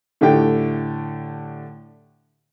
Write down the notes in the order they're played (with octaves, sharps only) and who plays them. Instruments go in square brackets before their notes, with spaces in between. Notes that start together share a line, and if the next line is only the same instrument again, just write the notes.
[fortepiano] A2 D3 A3 G4 G5